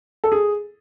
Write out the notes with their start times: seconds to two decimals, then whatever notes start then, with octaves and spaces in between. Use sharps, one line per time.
0.24 A4
0.32 G#4